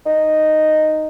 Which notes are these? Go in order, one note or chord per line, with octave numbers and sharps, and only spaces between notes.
D#4